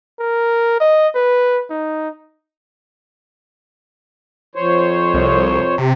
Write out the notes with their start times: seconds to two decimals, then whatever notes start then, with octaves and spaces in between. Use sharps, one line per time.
0.19 A#4
0.80 D#5
1.15 B4
1.70 D#4
4.55 F2 C5 C#5
5.14 C2
5.78 C3